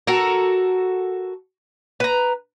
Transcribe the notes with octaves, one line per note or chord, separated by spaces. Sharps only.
F#4 A4 A#4
B4 A#5